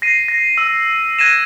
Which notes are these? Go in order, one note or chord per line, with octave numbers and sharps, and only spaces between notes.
A#6 C7 D#7
A#6
E6
F#6 G#6 A#6 D#7 E7